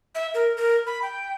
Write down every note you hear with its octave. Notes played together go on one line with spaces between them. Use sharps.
E5
A#4
A#4
B5
G5